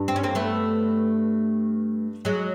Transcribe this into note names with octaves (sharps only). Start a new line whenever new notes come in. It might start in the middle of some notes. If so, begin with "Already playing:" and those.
Already playing: G2
C4
C#4
A#3 C4
A3 B3
F#3 G#3